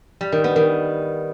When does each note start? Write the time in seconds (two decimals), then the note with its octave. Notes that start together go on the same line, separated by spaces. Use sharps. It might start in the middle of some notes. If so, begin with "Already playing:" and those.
0.21 G3
0.32 D#3
0.44 B3
0.56 D#3